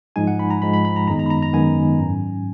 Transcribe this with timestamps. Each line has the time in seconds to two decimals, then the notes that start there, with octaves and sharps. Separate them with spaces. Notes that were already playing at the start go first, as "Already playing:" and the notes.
0.16 G#2 F3 G#3 D#4 G#5
0.27 F#5
0.39 B5
0.50 A#5
0.62 G#2 F3 G#3 D#4 B5
0.74 B5
0.85 B5
0.96 A#5
1.07 F#2 D#3 G#3 B3 D#4 A#5
1.19 A#5
1.26 B5
1.30 A#5
1.42 A#5
1.53 F#2 D#3 G#3 B3 D#4 G#5
1.99 G#2 F#3 C#4